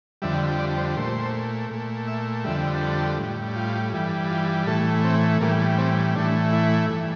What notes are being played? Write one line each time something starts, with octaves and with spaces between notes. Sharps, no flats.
F2 D3 G3 E5
D5
C5
A#2 A3 C5
A#2 A3
E5
F2 D3 G3 E5
A4
A2 G3
F4
G2 E3 G3
F4
A2 E3 A3 A4
C4
A2 E3 G3 A#3
C4
A2 E3 A3 D4
E4
G2 E3 A3